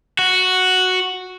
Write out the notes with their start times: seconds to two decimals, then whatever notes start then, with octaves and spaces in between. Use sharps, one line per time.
0.19 F#4